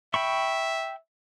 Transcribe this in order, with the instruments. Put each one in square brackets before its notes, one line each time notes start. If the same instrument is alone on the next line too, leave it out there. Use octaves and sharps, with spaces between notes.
[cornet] E5 [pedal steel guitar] G5 B5 C#6